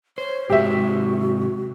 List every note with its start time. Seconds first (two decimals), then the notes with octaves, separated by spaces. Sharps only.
0.18 C5 C#5
0.50 G#2 C3 G#3 F#4 G4 E5